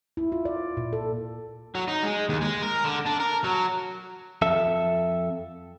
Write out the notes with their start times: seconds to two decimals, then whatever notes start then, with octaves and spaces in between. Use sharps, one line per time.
0.17 E4
0.32 F4
0.45 D5
0.77 A#2
0.93 A4
1.75 F#3
1.88 D#4
2.03 G#3
2.29 D#2
2.41 G#3
2.62 A#4
2.84 D3
3.06 D4
3.20 A#4
3.44 F#3
4.42 F2 A4 E5